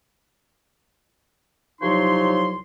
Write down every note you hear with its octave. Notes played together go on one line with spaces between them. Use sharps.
C2 F3 F#3 D#4 C#5 C6